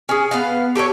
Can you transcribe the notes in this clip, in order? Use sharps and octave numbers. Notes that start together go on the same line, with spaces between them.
C#4 G#4
B3 B4 F5
G4 A4 A#4 C#5